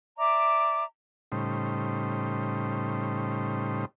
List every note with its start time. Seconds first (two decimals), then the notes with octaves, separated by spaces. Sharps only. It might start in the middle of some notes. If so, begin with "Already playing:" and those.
0.17 D5 E5 A#5 D6
1.32 A2 C#3 G3 D#4 C5